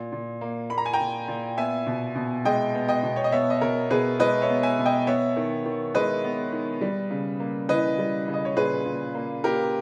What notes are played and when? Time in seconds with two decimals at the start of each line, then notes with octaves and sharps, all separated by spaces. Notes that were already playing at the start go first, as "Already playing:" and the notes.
Already playing: A#2
0.12 A#2
0.41 A#3
0.70 A#3 B5
0.78 A#5
0.86 G#5
0.93 G5 A#5
1.00 A#2
1.28 A#2
1.57 B3 E5 G#5
1.87 B2
2.15 B2
2.45 G#3 D#5 G5
2.74 B3
2.88 D#5 G5
3.03 B2
3.16 C#5
3.24 D#5
3.32 B3 C#5 E5
3.50 D#5
3.61 B2 A#4 C#5
3.90 B2 G#4 B4
4.20 G#3 B4 D#5
4.42 C#5 E5
4.49 B3
4.63 E5 G#5
4.78 B2
4.85 D#5 G5
5.07 B3 C#5 E5
5.36 D#3
5.65 D#3
5.94 G#3 B4 D#5
6.24 B3
6.52 D#3
6.81 G3
7.11 C#3
7.40 A#3
7.69 E3 B4 D#5
7.99 G3
8.28 C#3
8.34 D#5
8.45 C#5
8.56 A#2 G#4 B4
8.85 A#2
9.15 A#3
9.44 A#3 G4 A#4